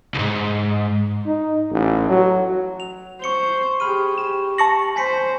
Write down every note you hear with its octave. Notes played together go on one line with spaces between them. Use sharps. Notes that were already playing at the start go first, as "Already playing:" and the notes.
C2 G#2
D#4
A1
F#3
F7
C5 C#6 C#7 G7
G4 G#4 B5 F6 D#7
G4 E7
A5 C#6 A#6 C#7 F#7
C5 G#5 B6 C#7